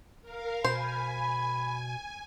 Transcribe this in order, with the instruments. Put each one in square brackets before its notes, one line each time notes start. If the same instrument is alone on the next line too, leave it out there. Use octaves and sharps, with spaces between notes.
[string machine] A#4 F5
[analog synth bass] B2 [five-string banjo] C5 [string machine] G#5 [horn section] B5